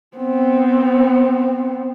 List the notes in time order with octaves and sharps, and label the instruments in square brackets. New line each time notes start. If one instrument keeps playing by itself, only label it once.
[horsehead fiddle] B3 C4